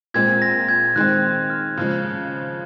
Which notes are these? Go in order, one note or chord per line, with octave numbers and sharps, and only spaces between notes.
A#2 G#3 C4 G#6
A#6
G#6
D#3 G#3 C4 F#6
F6
C#3 F3 G#3